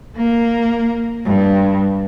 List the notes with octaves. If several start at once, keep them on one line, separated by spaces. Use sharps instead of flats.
A#3
G2